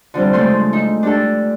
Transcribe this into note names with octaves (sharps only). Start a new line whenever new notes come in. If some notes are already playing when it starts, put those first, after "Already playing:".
D3 F3 G3 C4
C#3 G#3 A3 A4 C6 G6
D#4
D4 G4 A4